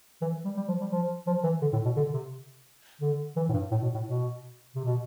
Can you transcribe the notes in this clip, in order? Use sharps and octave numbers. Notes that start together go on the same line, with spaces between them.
E3
G3
G3
F3
G3
F3
F3
E3
D3
A2
B2
D3
C3
D3
E3
A2
G2
A2
B2
A2
B2
C3
B2